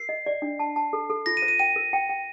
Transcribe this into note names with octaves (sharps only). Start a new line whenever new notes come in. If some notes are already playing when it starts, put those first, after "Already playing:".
Already playing: A#4 C7
D#5
D5
D4
A5
A5
A4
A4
F4 A#6
D#7
C5
D#7
G5 D#7
A#4
G5
G5